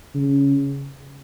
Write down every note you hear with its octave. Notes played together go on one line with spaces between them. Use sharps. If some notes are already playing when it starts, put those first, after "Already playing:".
C#3